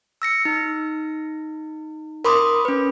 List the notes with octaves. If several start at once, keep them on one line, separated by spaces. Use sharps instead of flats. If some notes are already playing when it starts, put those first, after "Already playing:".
E6 A#6 C#7
D#4
A#4 B5 C6 D6 D#6
C#4 B4